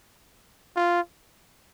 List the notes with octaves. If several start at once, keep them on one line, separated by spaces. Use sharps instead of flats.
F4